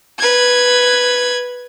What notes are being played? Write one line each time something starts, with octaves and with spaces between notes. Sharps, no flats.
B4 G#6